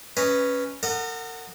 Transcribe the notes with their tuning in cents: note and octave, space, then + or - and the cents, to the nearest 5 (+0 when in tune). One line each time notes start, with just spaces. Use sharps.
C#4 +0 B4 +0 D#5 +0
A#4 -40 D#5 -20 F#5 +0